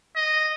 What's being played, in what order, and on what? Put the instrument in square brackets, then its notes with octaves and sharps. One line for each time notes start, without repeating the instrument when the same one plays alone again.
[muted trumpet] D#5